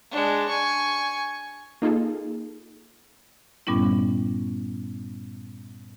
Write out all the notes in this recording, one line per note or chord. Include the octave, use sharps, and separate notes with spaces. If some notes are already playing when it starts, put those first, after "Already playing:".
G#3 D4
G#5 C#6
A#3 D#4 F4 G#4 A4
G2 A#2 G3 B3 C#4 E4